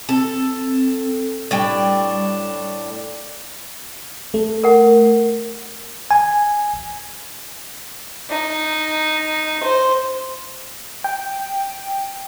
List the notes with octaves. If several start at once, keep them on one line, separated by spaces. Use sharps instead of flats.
C4 A4
A2 G3 D4 G5
A3
A#4 F#5
G#5
D#4
C5
G5